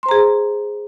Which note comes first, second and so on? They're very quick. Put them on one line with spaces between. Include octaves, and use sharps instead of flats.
C6 C5 A#5 G#4